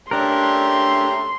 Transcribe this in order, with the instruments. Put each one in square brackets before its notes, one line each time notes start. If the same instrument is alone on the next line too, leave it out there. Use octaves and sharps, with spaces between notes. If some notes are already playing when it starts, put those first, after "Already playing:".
[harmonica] A3 C#4 E5 [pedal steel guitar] D4 A#4 [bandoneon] G4 A#5 [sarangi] C6